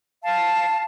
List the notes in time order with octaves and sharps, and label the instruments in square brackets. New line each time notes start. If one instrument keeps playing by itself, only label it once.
[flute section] F5 A5